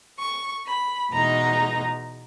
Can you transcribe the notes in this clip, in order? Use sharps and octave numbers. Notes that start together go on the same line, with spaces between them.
C#6
B5
E2 B2 G#3 D#4 A#5